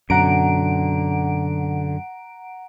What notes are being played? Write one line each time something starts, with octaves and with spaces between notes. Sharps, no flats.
F#2 B2 D3 F#5 A#5 D7